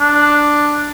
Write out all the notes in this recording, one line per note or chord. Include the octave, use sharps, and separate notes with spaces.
D4